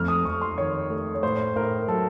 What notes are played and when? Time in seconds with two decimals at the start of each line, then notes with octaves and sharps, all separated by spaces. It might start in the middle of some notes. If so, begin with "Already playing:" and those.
Already playing: F2 A3 F6
0.08 D#6
0.25 F2 C#6
0.41 C6
0.58 D#3 C#5
0.90 A3
1.14 C#5
1.23 A2 C5
1.56 A2 A#4
1.88 F#3 A4